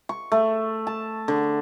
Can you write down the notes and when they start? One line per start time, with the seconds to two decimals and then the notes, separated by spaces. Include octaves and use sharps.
0.09 C#6
0.32 A3
0.87 A5
1.28 D3